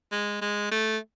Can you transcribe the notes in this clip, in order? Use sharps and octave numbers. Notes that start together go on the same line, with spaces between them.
G#3
G#3
A3